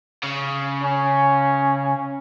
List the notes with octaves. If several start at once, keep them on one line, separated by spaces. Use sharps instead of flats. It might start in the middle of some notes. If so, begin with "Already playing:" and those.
C#3
C#4